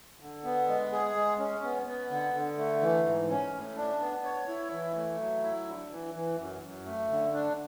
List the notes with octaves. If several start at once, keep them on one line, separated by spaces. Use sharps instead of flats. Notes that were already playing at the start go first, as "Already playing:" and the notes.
D3
B3
G#3
G#4
G#3
C#4
B3
B3
D3
D3
A3
E3
G#2
C#4
A2
D4
B3
C#5
E4
E3
A3
F#3
E4
D3
E3
E3
F#2
F#2
A3
D3
D4